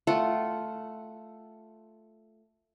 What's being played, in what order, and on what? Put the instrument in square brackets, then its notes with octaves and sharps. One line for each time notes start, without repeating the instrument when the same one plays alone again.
[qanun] A3 F4 F#5